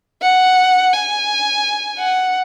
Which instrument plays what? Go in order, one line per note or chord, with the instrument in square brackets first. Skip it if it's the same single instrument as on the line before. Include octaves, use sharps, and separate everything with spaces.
[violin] F#5
G#5
F#5